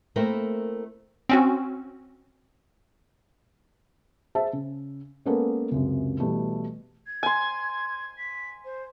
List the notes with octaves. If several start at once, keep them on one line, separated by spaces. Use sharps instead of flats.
A3 A#3 C4 E4 A#4
C4 C#4 F#4
G#4 C5 E5 A5
C#3
G#3 A#3 B3 C#4 A4 A#4
C#2 F#2 C3
B2 E3 G3 A3
G#6
G#5 C6
B6
C5